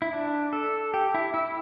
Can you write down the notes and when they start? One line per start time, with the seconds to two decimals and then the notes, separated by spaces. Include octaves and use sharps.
0.02 E4
0.13 D4
0.53 A4
0.94 G4
1.14 E4
1.34 E4